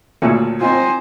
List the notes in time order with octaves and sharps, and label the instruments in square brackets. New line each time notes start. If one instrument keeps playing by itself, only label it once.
[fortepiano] D2 A#2 C#3 [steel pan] C#4 A4
[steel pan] C4 D#4 F4 [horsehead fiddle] C5 G#5